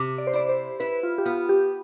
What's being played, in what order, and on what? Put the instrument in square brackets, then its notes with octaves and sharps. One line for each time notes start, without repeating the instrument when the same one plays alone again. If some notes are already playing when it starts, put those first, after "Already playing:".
Already playing: [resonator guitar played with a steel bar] C3
[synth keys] D5
C5
[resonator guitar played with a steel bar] E4 [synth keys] D5
[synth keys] C5
[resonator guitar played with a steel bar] E4 [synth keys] B4
[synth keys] F4
G4
[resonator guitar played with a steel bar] B3 [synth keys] F4
[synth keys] G4